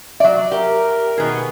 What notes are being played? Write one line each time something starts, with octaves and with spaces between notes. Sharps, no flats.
F#3 D5 E5
G4 A#4
B2 D#3 B3 G#4